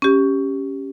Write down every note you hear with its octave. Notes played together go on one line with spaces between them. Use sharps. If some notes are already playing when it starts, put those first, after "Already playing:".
C#4 G4